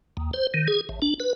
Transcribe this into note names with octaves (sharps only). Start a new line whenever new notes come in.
D#2
C5
D#3
G#4
A1
D4
B4